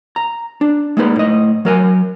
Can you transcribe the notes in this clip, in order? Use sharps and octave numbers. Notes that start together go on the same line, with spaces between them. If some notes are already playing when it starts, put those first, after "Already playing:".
A#5
D4
G#3 A#3 D#4 B4
A2 D#5
F#3 A#4 G#5